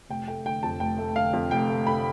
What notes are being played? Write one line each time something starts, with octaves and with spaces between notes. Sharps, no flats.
F1 G5
A3 G5
D3 G5
F2 A5
F1 G5
A3
D3 F5
F2
F1 G5
A3
D3 B5